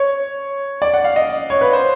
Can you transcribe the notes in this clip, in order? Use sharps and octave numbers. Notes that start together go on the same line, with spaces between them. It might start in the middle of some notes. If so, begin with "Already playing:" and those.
Already playing: C#5
D5
F#5
F5
D#5
C#5
B4
C5